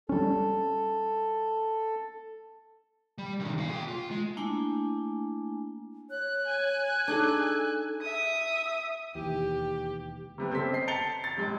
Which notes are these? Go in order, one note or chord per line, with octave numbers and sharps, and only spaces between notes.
G3 C#4 A4
G3
C3 D#3
A#2 F5
G#4 G5
F4
G#3
A3 A#3 D4 E4 G#5
C#5 F#6
G#5
D4 D#4 G#4 A4
E5 D#6
E1 D#2 E3 G4
C3 G3 B3
C#3 C4 A4 C5 B6
D#5 C7
A5 A#5 A6 C#7 F7 G7
A6
D#1 G3 G#3